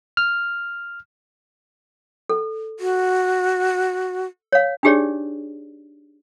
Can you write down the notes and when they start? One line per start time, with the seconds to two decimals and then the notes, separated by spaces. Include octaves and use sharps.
0.17 F6
2.29 A4
2.80 F#4
4.52 C#5 F5
4.83 D4 D#4 G4 G#4 C#5 D5